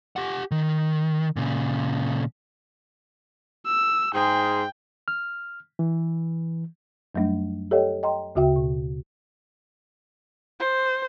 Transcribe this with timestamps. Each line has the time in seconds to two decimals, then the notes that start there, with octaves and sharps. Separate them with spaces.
0.16 G4 F#5
0.51 D#3
1.36 A#2 C#3
3.66 E6
4.14 G#2 G#4 G5 C6
5.08 F6
5.79 E3
7.15 F#2 F#3 G3 A3 D4
7.71 G4 A4 C#5 D#5 F5 G5
8.03 D#5 G5 A#5 C6
8.35 D2 C#3 F#4 E5 G5
8.56 B2
10.60 C5